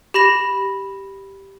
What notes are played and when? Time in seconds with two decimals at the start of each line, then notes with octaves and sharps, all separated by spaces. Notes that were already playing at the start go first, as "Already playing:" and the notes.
0.14 G4 B5 A#6 E7